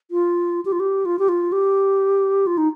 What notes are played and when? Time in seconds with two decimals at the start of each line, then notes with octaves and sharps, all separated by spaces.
0.11 F4
0.65 G4
0.72 F4
0.80 G4
1.05 F4
1.19 G4
1.29 F4
1.52 G4
2.47 F4
2.58 D#4